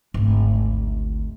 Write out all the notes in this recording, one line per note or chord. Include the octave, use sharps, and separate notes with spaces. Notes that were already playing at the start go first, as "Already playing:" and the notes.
G#1 D2